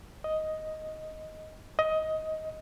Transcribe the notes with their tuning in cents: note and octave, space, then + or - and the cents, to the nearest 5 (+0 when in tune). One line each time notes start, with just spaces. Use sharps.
D#5 +5
D#5 +15